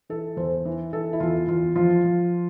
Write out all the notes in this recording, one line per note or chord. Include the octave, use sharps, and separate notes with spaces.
E3 A4
E2 C5
E3
E3 A4
E4
E2 F4
E2 F4
F3 F4
F3